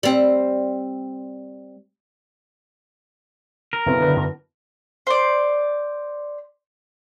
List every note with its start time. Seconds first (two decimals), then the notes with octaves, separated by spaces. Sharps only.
0.03 G3 C4
3.73 A#4
3.86 F#1 B1 B3 E4
4.01 D3 B4
4.16 F#2 D4
5.07 C5 D5